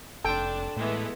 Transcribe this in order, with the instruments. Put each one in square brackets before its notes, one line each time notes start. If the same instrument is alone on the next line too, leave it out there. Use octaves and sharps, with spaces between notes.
[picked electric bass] F1 [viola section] D4 [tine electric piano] A4 C6 [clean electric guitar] G5
[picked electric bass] A2 [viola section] E3 G#3 B3